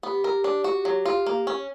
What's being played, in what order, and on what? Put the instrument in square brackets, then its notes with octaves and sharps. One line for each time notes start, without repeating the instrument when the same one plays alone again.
[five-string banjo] B3 [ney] G4
[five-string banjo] A#4
D4
F#4
F#3
F4
A#3
C#4